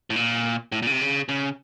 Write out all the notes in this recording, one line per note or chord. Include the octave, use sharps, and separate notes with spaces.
A2
A#2
A2
A#2
C#3
C3
C#3
C#3